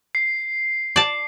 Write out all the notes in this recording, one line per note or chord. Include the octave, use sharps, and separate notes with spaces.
C7
D5 A5